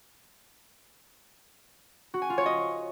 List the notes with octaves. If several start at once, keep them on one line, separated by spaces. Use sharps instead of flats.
F#4
G#5
F4
C#5
D#5